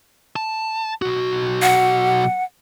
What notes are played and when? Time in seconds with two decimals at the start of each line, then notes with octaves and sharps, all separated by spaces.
0.36 A5
1.02 B1 F#4
1.62 F#5